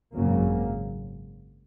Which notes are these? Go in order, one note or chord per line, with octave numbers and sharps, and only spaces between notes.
G#1 F#2 C#3 F#3 A#3